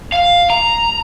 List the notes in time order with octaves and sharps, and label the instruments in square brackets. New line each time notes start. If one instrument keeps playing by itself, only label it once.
[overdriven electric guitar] F5
A#5